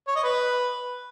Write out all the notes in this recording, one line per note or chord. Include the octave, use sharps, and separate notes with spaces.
C#5
D#5
B4